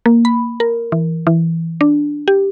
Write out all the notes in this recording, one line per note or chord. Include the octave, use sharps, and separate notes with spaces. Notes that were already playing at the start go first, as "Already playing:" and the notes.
A#3
B5
A#4
E3
E3
D4
G4